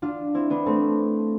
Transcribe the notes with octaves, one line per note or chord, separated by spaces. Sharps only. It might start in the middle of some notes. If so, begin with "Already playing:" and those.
D4 F4
C4 E4
B3 D4
A3 C4